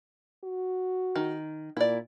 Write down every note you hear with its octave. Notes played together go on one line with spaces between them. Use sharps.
F#4
D#3
A#2 E4 D5